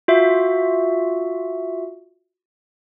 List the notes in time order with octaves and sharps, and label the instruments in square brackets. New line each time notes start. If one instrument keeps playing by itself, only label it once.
[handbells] F4 F#4 E5